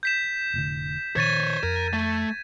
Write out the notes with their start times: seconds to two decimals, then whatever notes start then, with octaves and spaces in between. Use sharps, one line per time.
0.03 G6 B6 E7
0.54 F1 A2 D3
1.16 A#2 D#3 F3 C5 C#5 G#6 A6 D#7
1.63 F2 A#4
1.93 A3